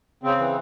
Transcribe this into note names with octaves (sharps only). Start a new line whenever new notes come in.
C#3 C4
E3